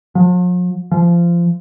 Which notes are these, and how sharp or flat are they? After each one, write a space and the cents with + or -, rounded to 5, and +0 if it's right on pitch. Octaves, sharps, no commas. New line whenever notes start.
F3 +45
F3 -25